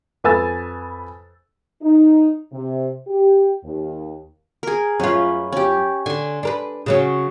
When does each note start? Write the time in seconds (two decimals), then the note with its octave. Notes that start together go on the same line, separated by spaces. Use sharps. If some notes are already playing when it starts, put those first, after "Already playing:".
0.24 F2 B4 G#5 E6 A6
1.81 D#4
2.52 C3
3.07 G4
3.64 D#2
4.63 G#4 A#4
5.00 F#2 C#4 F4 B4
5.52 C#4 G4
6.06 D3 G#5 C6
6.43 D4 A#4 B4
6.86 C#3 F#3 C#4